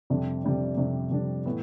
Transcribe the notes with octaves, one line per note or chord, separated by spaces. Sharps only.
F2 C3 G3 D4
F2 C3 G3 D4
F2 C3 G3 D4
F2 C3 G3 D4
A2 E3 B3